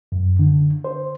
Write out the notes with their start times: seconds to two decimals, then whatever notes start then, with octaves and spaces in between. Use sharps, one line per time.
0.12 F#2
0.39 D3
0.84 C5